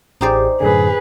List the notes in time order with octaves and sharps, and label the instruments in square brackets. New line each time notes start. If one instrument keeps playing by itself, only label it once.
[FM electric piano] A1 G4 G#4 [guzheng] D#4 C5 D5
[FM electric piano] F#2 A2 D3 [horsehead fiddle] G#4 B4